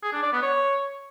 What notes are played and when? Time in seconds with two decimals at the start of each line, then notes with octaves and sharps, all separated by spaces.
0.03 G#4
0.13 D4
0.23 D5
0.32 B3
0.42 C#5